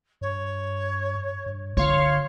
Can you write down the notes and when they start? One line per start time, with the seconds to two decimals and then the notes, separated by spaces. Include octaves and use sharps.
0.21 G2 C#5
1.46 G2
1.77 D3 F4 C#5 F5 C6